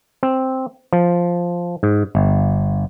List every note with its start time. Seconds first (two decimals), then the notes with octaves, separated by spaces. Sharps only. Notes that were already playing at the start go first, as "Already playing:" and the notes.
0.23 C4
0.93 F3
1.83 G#2
2.15 G1